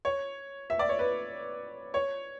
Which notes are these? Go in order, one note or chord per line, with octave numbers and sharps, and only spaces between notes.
C#5
E5
D5
C#5
B4
C#5